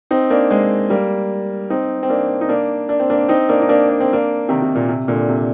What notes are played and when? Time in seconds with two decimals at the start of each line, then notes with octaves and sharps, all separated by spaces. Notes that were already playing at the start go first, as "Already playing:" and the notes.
0.11 C4 D#4
0.30 A#3 D4
0.50 G#3 C4
0.90 G3 A#3
1.70 C4 D#4
2.03 C4
2.09 A#3 D4
2.41 D#4
2.49 A#3 D4
2.89 D4
3.00 C4
3.10 A#3 D4
3.29 C4 D#4
3.49 A#3 D4
3.62 D#4
3.69 A#3 D4
3.89 D4
4.00 C4
4.13 A#3 D4
4.49 C3 D#3
4.62 C3
4.75 A#2
4.89 C3
5.08 A#2 D3
5.28 C3